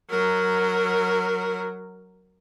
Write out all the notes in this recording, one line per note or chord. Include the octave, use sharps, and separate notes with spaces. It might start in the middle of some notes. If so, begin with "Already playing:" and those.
F#3 A#4